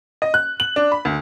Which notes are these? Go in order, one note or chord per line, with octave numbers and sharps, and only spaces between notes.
D#5
F#6
F#7
D4
B5
D2